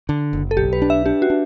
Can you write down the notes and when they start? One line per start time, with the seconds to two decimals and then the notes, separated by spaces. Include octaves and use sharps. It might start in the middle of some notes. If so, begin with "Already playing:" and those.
0.09 D3
0.33 F#1
0.51 A4
0.57 B1 G4
0.73 B4
0.82 D4
0.90 E5
1.06 D4 G4
1.22 F#4
1.30 D4